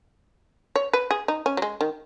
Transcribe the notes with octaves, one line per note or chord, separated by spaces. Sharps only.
C#5
B4
G#4
D#4
C#4
F#3
G#3
D#3